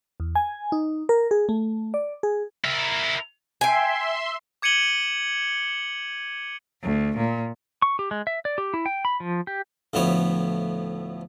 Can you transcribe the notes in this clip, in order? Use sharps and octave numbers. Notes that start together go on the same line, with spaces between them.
E2
G#5
D#4
A#4
G#4
A3
D5
G#4
E4 A#4
E5 G5 G#5 C6
D6 G#6 C#7 D#7 F#7 G7
D2
A#2
C#6
G4
G#3
E5
D5
G4
E4
G5
B5
F3
G4
D2 A2 F3 B3 C#5